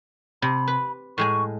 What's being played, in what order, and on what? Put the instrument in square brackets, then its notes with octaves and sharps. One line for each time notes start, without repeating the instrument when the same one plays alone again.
[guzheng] C3 [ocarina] B5
[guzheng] B4
[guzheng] A2 G#3 G#5 [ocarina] C#6